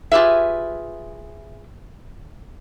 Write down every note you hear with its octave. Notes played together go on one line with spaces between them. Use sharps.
F4 G4 G#4 B4 E5